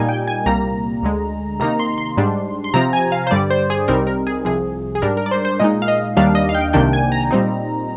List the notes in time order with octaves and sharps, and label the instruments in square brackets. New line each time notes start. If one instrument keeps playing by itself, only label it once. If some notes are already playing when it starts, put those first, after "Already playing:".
Already playing: [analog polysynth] A#2 G3 A#3 D#4 G#5
G5
G#5
C2 A#2 G3 A#3 A#5
D2 D3 G#3
C3 D#3 A#3 D#4 A#5
C6
C6
G#2 G3 D4
C6
C3 F3 C4 A#5
G#5
F5
C5
G2 D3 G3 D5
C5
G#4
C2 C3 G3 C4 D#4 A#4
A#4
G#4
C2 C3 F3 G#4
G#4
G#2 G3 D4 A#4
A#4
D5
C5
C5
A#2 G#3 D#4 D#5
F5
D#5
D#2 D#3 G3 D4 F5
D#5
F5
G5
C2 C3 D#3 A#3 D4 G5
G#5
A#5
A#2 G3 C4 D#4